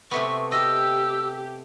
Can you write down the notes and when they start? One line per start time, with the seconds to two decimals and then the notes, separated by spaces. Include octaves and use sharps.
0.11 C3 A3 B3 C#6
0.52 G4 D#5 E6